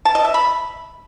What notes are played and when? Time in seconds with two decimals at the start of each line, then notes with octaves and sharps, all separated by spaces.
0.05 A5
0.15 D#5
0.25 E5
0.34 B5